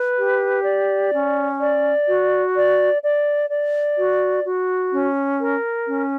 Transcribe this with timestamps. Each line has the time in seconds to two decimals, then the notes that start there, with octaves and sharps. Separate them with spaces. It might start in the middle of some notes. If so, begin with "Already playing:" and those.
Already playing: B4
0.18 G4
0.65 D5
1.13 C#4
1.60 D5
2.07 F#4
2.56 D5
3.02 D5
3.49 D5
3.98 F#4
4.45 F#4
4.93 C#4
5.39 A#4
5.88 C#4